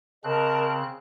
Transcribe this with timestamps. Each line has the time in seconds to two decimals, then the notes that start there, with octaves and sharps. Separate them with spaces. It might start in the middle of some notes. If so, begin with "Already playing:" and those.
0.24 C#3 C4 A#4 D#5 A5 F#6